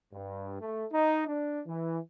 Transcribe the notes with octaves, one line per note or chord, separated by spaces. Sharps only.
G2
A3
D#4
D4
E3